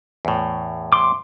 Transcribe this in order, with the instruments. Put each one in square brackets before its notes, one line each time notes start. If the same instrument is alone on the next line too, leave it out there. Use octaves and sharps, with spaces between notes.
[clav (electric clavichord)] E2 A2
[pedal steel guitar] C6 D6